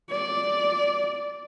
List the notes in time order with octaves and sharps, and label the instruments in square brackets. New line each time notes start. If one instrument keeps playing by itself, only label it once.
[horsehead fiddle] D5